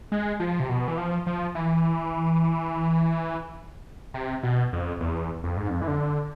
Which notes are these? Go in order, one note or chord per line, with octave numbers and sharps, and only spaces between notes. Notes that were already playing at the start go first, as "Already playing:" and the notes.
G#3
F3
C3
B2
E3
F3
F3
E3
C3
B2
F2
E2
F2
G#2
F2
E3
D3